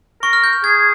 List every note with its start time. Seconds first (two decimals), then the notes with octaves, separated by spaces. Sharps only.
0.22 A#4 C#6
0.33 F6
0.44 G6
0.53 F6
0.64 G#4 G#6